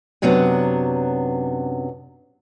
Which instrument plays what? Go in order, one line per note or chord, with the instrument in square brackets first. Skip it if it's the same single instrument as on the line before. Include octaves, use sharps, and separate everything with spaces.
[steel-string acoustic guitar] F#2 C3 F#3 B3 D4